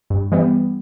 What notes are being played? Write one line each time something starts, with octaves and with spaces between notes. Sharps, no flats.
G2
E3 G3 B3